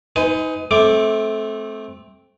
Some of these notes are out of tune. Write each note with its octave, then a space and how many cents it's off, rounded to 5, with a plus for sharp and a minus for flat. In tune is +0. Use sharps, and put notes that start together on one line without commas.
D#4 +25 B4 +45 G#5 +0
A3 -20 C4 +10 D6 +0